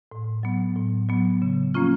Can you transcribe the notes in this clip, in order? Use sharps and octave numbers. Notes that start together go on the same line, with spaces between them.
A2
F#3 B3
A2
F#3 B3
C#3
F3 A#3 C#4 F4